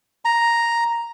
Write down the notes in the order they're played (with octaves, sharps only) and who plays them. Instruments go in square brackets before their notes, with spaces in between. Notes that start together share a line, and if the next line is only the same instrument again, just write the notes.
[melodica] A#5